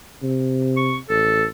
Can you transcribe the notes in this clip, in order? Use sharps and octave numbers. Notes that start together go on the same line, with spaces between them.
C3
C#6
A1 A4